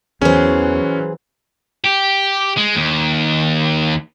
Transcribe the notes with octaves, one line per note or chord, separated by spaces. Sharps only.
E2 E3 F#3 C#4 G#4 C5
G4
G#3
D#2